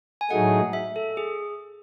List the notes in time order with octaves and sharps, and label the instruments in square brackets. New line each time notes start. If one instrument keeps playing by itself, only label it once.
[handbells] G#5
[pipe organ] A2 F#3 A3 D#4 G#4 [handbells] F#5
[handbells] E5
A4
G#4